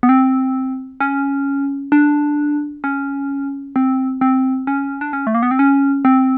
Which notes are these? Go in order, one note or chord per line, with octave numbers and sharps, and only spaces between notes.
B3
C4
C#4
D4
C#4
C4
C4
C#4
D4
C#4
A3
A#3
B3
C4
C#4
C4